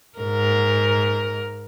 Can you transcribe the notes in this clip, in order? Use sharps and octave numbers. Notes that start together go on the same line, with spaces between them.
G#2 A#4